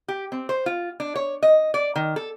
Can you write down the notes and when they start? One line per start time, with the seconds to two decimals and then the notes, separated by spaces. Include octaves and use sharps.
0.08 G4
0.32 C4
0.49 C5
0.66 F4
1.00 D4
1.16 C#5
1.43 D#5
1.74 D5
1.96 D#3
2.16 A4